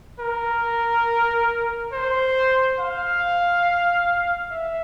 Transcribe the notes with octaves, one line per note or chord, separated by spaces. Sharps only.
A#4
C5
F5
E5